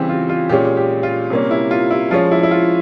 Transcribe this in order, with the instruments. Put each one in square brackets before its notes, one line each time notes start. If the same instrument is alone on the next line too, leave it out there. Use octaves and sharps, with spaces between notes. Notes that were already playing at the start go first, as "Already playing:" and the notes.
Already playing: [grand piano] C#3 E3 G3 C4 G4
F4
F4
A#2 G#3 C#4 G4
G4
F4
C3 G3 A#3 C#4
E4
F4
E4
F3 G#3 C#4 F4
E4
E4
F4